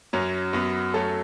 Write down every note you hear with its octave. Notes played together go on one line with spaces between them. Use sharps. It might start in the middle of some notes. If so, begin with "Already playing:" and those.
F#2 F#3 C#4
F#2 F#3 B3
F#2 F#3 A3 C#4 A4